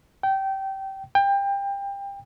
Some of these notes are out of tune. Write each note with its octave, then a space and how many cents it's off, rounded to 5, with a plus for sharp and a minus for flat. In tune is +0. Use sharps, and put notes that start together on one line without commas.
G5 -20
G5 +25